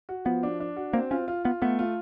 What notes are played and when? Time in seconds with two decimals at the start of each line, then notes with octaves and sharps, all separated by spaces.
0.09 F#4
0.25 F3 B3
0.43 D4
0.60 D4
0.76 F#4
0.93 A#3 C4
1.11 C#4 F4
1.28 F4
1.45 B3 F4
1.62 A3 B3
1.79 F4